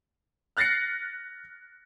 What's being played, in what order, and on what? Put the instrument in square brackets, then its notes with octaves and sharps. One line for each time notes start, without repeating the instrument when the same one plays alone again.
[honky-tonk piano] F6 F#6 A6 A#6 C7 C#7